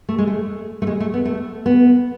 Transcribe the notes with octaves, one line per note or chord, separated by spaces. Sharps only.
A3
G#3
A3
A3
G#3
A3
B3
A3
B3